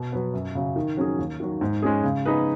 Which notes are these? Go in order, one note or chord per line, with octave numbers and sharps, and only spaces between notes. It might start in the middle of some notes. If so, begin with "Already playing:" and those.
Already playing: B2
F#3 B3
F#2
C#3 F#3
D#3
F#3 C#4 G#4
D#2
D#3 F#3
G#2
G#3 C#4 G#4
C#3
B3 D#4 G#4 B4